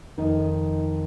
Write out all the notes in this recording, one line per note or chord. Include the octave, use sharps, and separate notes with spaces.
F2 D#3 D#4